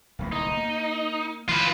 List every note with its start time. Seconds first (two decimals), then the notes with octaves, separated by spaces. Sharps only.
0.19 D1 C2 A#3
0.32 D#4
0.57 A#3
1.49 E3 F4 B4